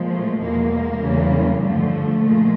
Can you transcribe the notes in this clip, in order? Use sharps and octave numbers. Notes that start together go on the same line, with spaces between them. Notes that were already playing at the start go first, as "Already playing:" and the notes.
Already playing: A#2 F3 G#3
A3
E2 B2 G#3 A#3
E2 C#3 E3 G3
G2 D3 F3 A3
A#2 F3 G#3